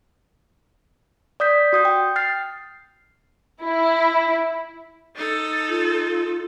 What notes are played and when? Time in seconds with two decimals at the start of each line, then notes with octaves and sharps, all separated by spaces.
1.40 D5 D#6 G6 B6
1.73 F#4 D#6 G6
1.85 G5
2.16 F6 A6 C7
3.64 E4
5.15 D#4 A4
5.69 F4